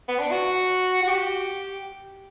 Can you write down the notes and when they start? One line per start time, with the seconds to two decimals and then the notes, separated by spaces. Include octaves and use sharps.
0.08 B3
0.19 D4
0.31 F#4
1.03 F#4
1.09 G4